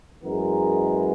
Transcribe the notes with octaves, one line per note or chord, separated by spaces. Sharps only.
F#2 E3 G#3 B3 A#4